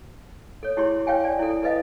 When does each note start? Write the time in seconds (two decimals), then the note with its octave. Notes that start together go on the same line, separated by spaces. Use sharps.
0.63 A4 C#5
0.77 E4 G4 G#4 C#5 C6
1.07 C#5 F5 G5 G#5
1.24 D5 G#5
1.39 E4 A4
1.63 A4 B4 D#5 F5